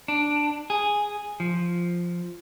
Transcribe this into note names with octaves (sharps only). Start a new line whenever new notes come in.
D4
G#4
F3